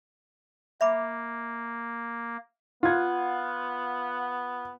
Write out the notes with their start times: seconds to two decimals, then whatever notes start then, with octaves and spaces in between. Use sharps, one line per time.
0.81 A#3 E5 B5 D6
2.83 B3 F4 F#5 G#6